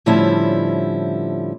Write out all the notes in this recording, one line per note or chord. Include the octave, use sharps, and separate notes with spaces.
A2 D3 F3 G3 C#4 E4